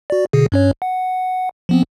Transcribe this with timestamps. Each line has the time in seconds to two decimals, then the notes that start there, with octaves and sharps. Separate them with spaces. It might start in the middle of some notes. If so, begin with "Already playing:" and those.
0.10 F#4 D5
0.33 B2 D3 G#4
0.52 G2 C#4 C#5
0.82 F#5
1.69 F3 B3 C4